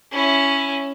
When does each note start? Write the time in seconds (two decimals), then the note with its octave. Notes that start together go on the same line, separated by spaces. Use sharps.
0.12 C#4 E4